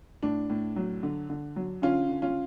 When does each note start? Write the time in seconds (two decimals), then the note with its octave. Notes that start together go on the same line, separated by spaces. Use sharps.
0.23 A2 D4
0.50 A2
0.76 F#3
1.03 D3
1.30 D3
1.56 F#3
1.82 D3 C#4 F4
2.09 D3
2.22 C#4 F4